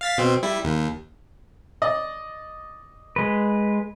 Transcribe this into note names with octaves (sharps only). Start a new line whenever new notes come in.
F5 A6 B6
B2 C4
G3 E4
D#2
D5 D#5
G#3 B4